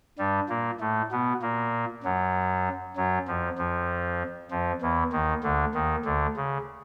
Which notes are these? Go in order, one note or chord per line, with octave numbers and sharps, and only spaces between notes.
G2 G3
A#2 A#3
A2 A3
B2 B3
A#2 A#3
F#2 F#3
F#2 F#3
F2 F3
F2 F3
F2 F3
E2 E3
D#2 D#3
D2 D3
D#2 D#3
D2 D3
C#3